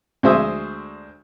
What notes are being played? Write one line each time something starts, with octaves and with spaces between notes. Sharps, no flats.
D2 G#3 C5 E5 D#6